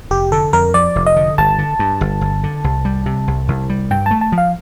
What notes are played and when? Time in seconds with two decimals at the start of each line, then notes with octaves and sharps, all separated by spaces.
0.11 F1 G4
0.32 D3 A4
0.53 F2 A#4
0.74 F3 D5
0.96 F1
1.06 D#5
1.16 D3
1.38 G1 A5
1.58 D3
1.79 G2
2.01 G1
2.21 G1
2.43 D3
2.64 C2
2.85 G3
3.06 C3
3.28 C2
3.48 C2
3.70 G3
3.90 G2 G5
4.06 A3 A5
4.21 A5
4.32 F3
4.38 F5